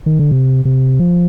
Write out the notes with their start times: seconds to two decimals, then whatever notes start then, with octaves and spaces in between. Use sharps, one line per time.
0.06 D#3
0.19 D3
0.31 C3
0.65 C3
1.00 F3